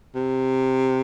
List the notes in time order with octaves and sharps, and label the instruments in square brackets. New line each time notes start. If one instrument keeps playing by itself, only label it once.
[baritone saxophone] C3